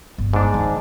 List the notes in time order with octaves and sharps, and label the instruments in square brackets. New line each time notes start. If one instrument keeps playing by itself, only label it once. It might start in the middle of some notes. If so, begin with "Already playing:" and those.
[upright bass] G1
[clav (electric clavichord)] G#2 D4
[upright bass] D#3